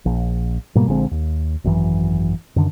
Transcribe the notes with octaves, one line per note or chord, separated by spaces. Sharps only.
A#1
G#2 B2 G3 A#3
A#1 D3 G#3 C4
D#2
G#1 F#2 D#3 E3
F#2 D3 D#3